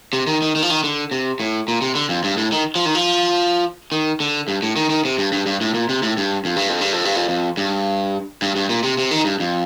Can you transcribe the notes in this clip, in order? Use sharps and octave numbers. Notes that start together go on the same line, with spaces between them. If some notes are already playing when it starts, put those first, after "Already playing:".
C3
D#3
D#3
D#3
F3
D#3
D3
C3
A2
A#2
C3
D3
F2
G2
A2
D#3
F3
D#3
F3
D#3
D3
G2
A2
D#3
D#3
C3
G2
G2
G2
A2
A#2
C3
A2
G2
F2
G2
F2
G2
F2
G2
F2
F2
G2
G2
G2
A#2
C3
C3
D#3
G2
F2